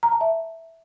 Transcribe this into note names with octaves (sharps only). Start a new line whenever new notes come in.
A#5
A5
E5